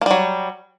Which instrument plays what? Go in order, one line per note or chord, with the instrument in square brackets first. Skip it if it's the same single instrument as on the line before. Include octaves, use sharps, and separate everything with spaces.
[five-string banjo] A#3
G3
F#3